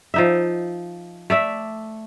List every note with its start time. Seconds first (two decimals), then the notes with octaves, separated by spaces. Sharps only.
0.14 F3 D#4 E5
1.30 A3 D5 E5